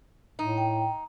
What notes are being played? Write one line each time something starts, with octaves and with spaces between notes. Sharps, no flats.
A2 D#4
G5